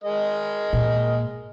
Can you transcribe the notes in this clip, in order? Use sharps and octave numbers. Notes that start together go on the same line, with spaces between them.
G#3 A#4 D#5
A#2